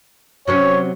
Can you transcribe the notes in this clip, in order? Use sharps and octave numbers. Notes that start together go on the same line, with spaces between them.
C3 F#3 C#4 C#5